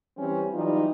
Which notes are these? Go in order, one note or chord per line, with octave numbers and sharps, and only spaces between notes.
E3 G3 C4 C#4
E3 F#3 G3 D#4 F4